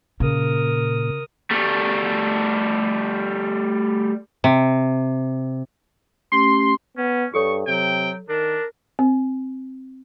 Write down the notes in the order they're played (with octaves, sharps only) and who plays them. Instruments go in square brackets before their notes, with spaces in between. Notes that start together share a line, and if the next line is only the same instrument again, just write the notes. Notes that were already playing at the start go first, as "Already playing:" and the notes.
[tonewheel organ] A#2 [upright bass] C#3 [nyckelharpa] A#4 D#6
[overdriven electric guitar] G3 A3
[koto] C3
[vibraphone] A3 C#4 G4 [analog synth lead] C6
[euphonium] B3 [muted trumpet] C#4
[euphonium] G2 [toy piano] G4 A4 C#5 [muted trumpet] C#6
[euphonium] C3 [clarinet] F#3 [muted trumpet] G5
[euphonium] D#3 [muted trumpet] D4 [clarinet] A#4
[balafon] C4